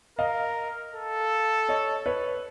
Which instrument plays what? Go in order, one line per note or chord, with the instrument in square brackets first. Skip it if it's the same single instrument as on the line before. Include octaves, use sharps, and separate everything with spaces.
[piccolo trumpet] A#4 [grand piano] D#5 F5
[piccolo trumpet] A4
[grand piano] C#5 D#5
B4 C#5